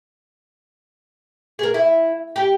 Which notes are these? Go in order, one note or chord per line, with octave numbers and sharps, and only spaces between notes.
G#4 A#4
E4
G4